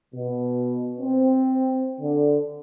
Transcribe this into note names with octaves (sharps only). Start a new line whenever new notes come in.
B2
C4
D3